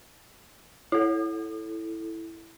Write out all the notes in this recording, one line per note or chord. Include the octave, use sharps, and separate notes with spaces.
E4 A4